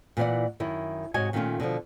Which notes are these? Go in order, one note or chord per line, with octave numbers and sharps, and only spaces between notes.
A#2 E3 F#4 D5 F#5
F#2 D#3 E4
G#2 C3 F#4 C#5 D#5 G#5
A#2 D#3 A3 C4 C#4 F4
B2 D3 D#3 F3